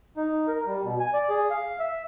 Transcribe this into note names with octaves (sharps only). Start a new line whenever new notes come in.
D#4
A#4
G3
B2
G#5
D5
G#4
F5
E5